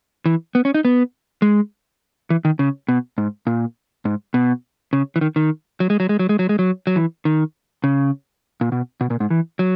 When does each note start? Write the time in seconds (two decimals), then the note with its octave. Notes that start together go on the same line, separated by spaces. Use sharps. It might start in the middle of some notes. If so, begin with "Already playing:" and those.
0.26 E3
0.55 B3
0.65 C#4
0.74 D#4
0.85 B3
1.42 G#3
2.30 E3
2.45 D#3
2.59 C#3
2.88 B2
3.18 G#2
3.47 A#2
4.05 G#2
4.34 B2
4.93 C#3
5.16 E3
5.21 D#3
5.36 D#3
5.80 F#3
5.90 G#3
6.00 F#3
6.09 G#3
6.19 F#3
6.29 G#3
6.39 F#3
6.49 G#3
6.59 F#3
6.87 F#3
6.96 E3
7.25 D#3
7.84 C#3
8.61 A#2
8.72 B2
9.01 B2
9.10 A#2
9.20 G#2
9.30 E3
9.59 F#3